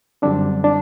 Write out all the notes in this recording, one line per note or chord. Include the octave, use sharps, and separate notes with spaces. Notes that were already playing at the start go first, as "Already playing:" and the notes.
F#2 D3 G3 C4 D4
D4